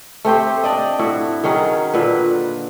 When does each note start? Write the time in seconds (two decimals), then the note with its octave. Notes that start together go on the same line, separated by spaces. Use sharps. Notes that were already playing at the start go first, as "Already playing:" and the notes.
0.25 A3 C4 G4 C5
0.63 D4 D5 D#5
0.99 A2 E4 F#4
1.44 D#3 F#3 C#4 G#4
1.94 A#2 D3 B4